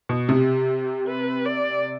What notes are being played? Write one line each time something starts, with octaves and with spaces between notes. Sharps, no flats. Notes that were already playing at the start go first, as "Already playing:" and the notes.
B2
C3 G4
B4
D5